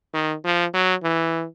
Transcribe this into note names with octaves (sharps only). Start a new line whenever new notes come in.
D#3
F3
F#3
E3